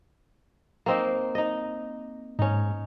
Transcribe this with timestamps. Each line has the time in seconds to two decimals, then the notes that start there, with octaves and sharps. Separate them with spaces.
0.86 A#3 C4 D#4
1.35 D#4 D#5
2.39 G#2 C#4 D#4